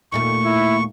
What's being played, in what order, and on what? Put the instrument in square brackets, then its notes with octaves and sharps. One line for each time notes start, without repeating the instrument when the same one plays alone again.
[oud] D#2 A#2 A3 [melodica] C#6
[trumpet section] E4